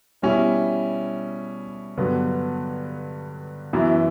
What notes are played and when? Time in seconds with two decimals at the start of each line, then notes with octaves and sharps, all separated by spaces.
0.22 B2 G3 C#4 E4
1.98 G2 D3 F#3 B3
3.73 F#2 E3 B3 E4